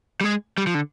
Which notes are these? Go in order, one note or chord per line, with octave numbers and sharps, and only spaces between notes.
G3
G#3
G3
F3
D3